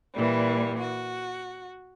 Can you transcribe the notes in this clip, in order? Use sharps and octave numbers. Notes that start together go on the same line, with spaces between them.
A#2 E3 G3
F#4